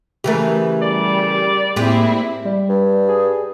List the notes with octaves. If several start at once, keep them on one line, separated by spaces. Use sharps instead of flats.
C#3 E3 A3 G4 A#4
G3 D5
A2 G#3 A#3 C4 E4 G4
G3
G2
G#4